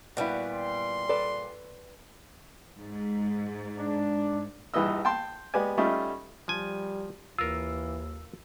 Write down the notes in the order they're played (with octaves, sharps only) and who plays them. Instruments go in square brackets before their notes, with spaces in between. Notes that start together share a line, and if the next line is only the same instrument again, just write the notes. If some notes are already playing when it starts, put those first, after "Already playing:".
[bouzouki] A#2 G3 [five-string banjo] B3 E4 [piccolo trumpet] F#4
[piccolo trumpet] C6
[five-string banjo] A4 B4 D5
[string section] G#2
[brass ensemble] D4
[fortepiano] A#1 G2 E3 D#4 D#5 E6
G5 A5 C6
G#3 B3 G4 D5 G#5
G3 A3 C#4 D#4 F4
[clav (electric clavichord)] F3 G#5 [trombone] G3
[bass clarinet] D#2 [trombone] E3 [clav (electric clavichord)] F4 A#4 [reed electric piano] E6